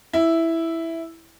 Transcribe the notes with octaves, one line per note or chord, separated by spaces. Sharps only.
E4